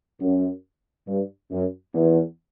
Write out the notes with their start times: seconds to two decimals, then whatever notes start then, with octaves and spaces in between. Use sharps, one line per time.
0.21 F#2
1.07 G2
1.51 F#2
1.94 E2